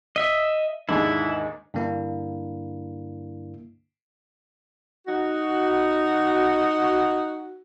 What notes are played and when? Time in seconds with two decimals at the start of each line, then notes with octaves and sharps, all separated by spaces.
0.16 D#5 E5
0.89 D#2 G#2 D3 E4
1.74 G2 D3 A#3 D4 E4
5.07 D#4 F#4